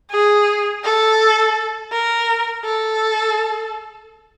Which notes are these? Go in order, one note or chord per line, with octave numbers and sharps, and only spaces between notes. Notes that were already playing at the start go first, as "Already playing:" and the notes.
G#4
A4
A#4
A4